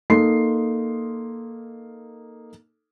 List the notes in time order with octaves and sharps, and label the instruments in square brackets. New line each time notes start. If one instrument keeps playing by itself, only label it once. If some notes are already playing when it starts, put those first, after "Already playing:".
[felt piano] A#3 D#4 A4 C6 C7